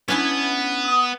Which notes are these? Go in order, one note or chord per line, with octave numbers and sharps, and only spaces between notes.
B3 C#4 D4 E4
D#6